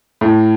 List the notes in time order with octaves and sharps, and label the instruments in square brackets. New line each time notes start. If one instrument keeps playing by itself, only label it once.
[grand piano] A2